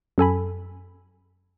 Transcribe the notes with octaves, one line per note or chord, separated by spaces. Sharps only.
F#2 A4 G#5 B5